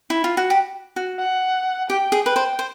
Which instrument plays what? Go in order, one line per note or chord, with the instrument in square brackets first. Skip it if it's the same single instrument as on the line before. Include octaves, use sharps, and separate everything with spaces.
[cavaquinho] E4
F4
F#4
G4
F#4
[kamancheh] F#5
[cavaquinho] G4 [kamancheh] G5
[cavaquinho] G#4
[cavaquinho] B4 [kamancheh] G5
[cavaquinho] C5
C5